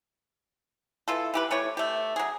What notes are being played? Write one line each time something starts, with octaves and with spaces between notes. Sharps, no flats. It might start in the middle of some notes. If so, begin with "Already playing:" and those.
E3 F4 A4
E3 G4 B4
E3 A3 G4 C#5
A3 G4
F#3 G#4